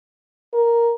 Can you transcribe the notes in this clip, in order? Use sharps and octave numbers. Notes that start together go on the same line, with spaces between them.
A#4